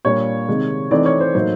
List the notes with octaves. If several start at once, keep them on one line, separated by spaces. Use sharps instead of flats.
A#2 G3 A#3 D4 C#5
C3 D#3 G#3
E3 A3 C4 D#4 D5
C#5
C5
A2 F#3 A#3 D#4 C5